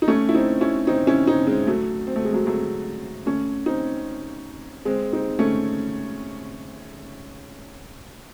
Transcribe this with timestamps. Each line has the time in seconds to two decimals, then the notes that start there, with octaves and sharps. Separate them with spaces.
0.02 D#4
0.08 A3 C#4
0.29 E4
0.34 C4 D#4
0.61 C#4 E4
0.87 C4 D#4
1.07 C#4 E4
1.27 C4 D#4
1.47 G#3 C4
1.67 F#3 A3
2.07 C4
2.16 A3
2.25 G#3
2.33 F#3 A3
2.47 F#3 A3
3.26 A3 C#4
3.66 C4 D#4
4.85 G#3 C4
5.12 C4 D#4
5.39 A3 C#4